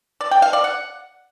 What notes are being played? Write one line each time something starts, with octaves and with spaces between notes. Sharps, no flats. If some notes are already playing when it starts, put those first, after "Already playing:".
D5
G5
F5
D5
F#5